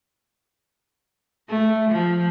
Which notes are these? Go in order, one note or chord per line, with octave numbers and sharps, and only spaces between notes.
A3
F3